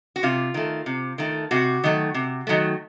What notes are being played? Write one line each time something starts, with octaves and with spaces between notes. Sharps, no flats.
F#4
C3 F4
D#3 A3
C3
D#3 A3
C3 F#4
D#3 F#3 A3
C3
D#3 F#3 A3